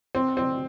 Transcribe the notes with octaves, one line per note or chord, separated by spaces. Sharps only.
C4
C4